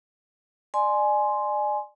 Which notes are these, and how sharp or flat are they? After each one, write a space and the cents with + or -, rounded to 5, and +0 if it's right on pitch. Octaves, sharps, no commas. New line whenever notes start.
D5 +30 G#5 +15 C6 +0